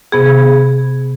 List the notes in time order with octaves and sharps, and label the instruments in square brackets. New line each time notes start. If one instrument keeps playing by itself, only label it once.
[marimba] C3 B3 G#4